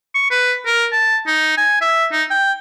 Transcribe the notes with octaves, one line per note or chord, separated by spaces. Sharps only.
C#6
B4
A#4
A5
D#4
G#5
E5
D#4
G5